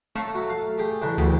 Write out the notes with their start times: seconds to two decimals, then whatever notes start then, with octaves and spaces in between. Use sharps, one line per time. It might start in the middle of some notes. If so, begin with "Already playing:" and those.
0.16 A3 C#5 F5 A#5
0.35 F#3
0.49 F5
0.78 G4 G#4
1.02 A1 C#3 D4
1.18 A1 D2 G4